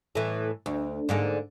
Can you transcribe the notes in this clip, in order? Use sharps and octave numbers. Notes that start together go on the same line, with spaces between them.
A2 E3
D2
G#2 D3 A#3